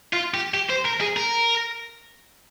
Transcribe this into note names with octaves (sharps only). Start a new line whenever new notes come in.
F4
G4
G4
C5
A#4
G#4
A#4